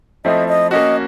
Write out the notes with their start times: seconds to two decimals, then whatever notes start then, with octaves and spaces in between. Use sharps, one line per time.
0.25 F3 A3 C4 E4 D#5
0.48 D#5
0.71 A#3 C#4 F#4 D#5